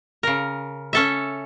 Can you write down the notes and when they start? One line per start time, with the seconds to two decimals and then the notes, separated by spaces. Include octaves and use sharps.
0.23 C#3 A#4
0.93 C#4 A4 E5